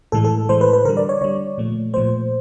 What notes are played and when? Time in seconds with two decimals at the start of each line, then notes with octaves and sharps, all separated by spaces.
0.12 A2 E3 G#3 A4
0.24 A4
0.49 A2 E3 G#3 C5
0.61 B4
0.73 B4
0.85 D3 A#4
0.89 G3
0.97 D5
1.09 C#5
1.21 D3 G3 C#5
1.58 A#2 F3 A3
1.93 A#2 F3 A3 C5